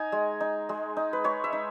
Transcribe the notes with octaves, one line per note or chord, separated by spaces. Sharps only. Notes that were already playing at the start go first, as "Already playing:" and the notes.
Already playing: D#4 G#5 A#5
G#3
D#4
G#3
D#4
B4
G#3 C#5
E5
D#4